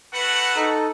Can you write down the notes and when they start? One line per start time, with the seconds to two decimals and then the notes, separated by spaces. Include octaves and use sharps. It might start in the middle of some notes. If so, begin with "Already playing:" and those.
0.13 A3 F#4 B4 F#5
0.56 D#4 A4